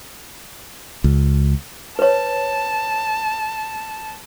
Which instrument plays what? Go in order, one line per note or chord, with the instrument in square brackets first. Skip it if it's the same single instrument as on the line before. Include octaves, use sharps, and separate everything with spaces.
[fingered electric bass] C#2
[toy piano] B4 C#5 [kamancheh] A5